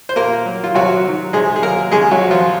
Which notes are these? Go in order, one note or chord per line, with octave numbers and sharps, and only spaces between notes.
C5
A#2 A#3 A#4
F#3
F4
C3 F#3 F#4
D#3 F#3
C3 G#3 G#4
G#4
F#3 A#3 A#4
C#3 G#3 G#4
F#3 F#4
F3
F3 F4